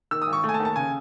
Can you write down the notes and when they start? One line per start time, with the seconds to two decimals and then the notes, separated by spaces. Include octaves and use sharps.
0.11 D#3 E6
0.22 D#6
0.27 G#1
0.33 C#6
0.44 A3
0.49 G#5
0.54 A5
0.60 D#2
0.65 A5
0.76 C#3 G#5